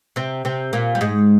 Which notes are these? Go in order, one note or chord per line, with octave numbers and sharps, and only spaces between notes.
C3 C4
C3 C4
A#2 A#3
G3
G#2 G#3